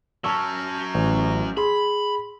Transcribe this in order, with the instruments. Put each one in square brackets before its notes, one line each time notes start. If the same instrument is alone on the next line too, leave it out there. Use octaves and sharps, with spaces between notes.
[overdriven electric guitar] F#3 C#4 [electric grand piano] A5 C#6 E6
[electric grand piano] A1
[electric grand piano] G#4 C6 [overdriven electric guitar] B5